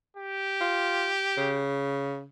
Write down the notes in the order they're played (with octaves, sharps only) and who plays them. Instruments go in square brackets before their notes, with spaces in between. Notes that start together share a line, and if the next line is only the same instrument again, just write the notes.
[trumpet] G4
[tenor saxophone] F4
C#3